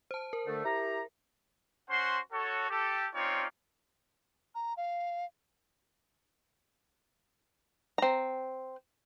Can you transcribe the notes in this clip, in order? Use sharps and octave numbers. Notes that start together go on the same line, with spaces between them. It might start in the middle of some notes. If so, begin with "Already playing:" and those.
C5 A5
A#4
D3 A3
E4 G4 A#5
C#4 F#4 C5 F#5 C6
F#4 A4 C#5
G4 A4
C4 C#4 D#4 F4 C#5 D5
A#5
F5
C4 A#5